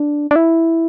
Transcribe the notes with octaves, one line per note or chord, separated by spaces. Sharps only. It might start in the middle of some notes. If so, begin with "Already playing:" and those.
Already playing: D4
D4
E4